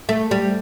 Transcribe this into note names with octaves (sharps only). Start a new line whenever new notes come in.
A3
G3